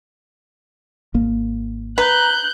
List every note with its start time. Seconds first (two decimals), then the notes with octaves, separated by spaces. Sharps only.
1.14 G#1 A#3
1.98 B4 A#5 F#6 G6